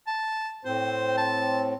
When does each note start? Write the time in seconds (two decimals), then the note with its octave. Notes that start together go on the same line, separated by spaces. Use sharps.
0.08 A5
0.65 A2 C4 C5
1.18 A5